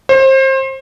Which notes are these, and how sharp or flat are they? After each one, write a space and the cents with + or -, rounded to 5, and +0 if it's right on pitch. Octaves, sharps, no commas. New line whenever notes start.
C5 +30